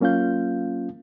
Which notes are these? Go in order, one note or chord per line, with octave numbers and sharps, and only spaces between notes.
F#3 A#3 C#4 F4 F5 G6